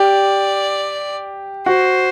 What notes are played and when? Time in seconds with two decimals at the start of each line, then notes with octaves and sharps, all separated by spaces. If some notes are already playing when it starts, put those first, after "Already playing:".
Already playing: G4 D5
1.66 F#4 C5